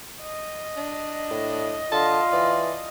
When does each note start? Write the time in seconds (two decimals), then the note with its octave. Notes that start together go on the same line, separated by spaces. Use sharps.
0.22 D#5
0.77 D4
1.30 A2
1.92 D3 F4 A5
2.33 E3 D5